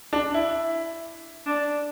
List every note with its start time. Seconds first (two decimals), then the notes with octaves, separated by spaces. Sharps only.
0.13 D4
0.34 E4
1.46 D4